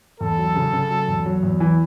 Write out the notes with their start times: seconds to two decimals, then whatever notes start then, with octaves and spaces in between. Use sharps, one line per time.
0.20 E2 A4
0.38 F#3
0.56 C#3
0.73 C#3
0.90 F#3
1.08 E2
1.26 F#3
1.43 E2
1.60 E3